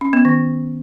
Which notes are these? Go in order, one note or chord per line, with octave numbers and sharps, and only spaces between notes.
C#4
B3
D#3